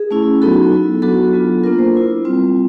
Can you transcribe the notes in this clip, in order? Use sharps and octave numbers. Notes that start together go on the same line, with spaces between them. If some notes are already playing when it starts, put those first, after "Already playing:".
Already playing: G#4
A3 C#4 E4
F#3 B3 D#4 F#4 A4
B3 E4
F#3 B3 D4 F#4 A4
F#3 B3 D4 F4
A#3 D4 F4 A#4
C5
B3 E4
G3 C4 F4